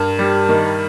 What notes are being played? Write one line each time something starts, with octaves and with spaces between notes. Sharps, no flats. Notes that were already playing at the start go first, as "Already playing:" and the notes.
Already playing: G2 A#4
G3
D#3